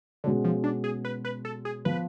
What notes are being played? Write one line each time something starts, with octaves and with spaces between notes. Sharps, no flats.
B2 D3 G#3 C#4 F#4
F3
D4
G#4
B4
B4
A4
G#4
F3 B3 B4